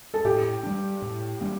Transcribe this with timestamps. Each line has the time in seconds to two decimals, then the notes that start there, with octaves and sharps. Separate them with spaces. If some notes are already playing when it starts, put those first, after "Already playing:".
0.14 A4
0.25 A2 G4
0.63 G3 A#3 D4
1.02 A2
1.41 G3 A#3 D4